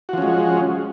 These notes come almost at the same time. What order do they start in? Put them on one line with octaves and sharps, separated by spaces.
F#4 F3 C#4 G#3